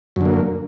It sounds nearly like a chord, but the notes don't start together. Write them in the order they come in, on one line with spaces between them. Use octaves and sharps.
F#2 D3 A#3